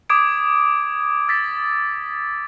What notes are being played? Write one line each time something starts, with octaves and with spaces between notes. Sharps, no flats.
D6 D#6 G#6 D7
E6 A6 B6